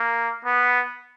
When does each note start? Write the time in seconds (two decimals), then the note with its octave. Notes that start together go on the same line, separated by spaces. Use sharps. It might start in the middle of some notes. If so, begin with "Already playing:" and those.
Already playing: A#3
0.45 B3